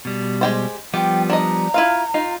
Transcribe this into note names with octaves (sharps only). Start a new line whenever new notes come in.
B2 G3
G#3 G4 C5
F3 G3 B3 G4 G5
D4 D#5 A#5
E4 F4 F5
D#4 F4